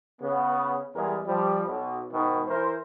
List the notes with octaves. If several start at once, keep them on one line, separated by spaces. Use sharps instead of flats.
C#3 B3
E2 E3 G3 G#3 G#4 A#4
F3 G3
B1 B2
G#2 B2 D#3
E3 E4 A#4 C5